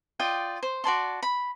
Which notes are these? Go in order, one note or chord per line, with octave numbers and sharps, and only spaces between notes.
F4 D5 D#5 G5
C5
F#4 D5 A5 C6
B5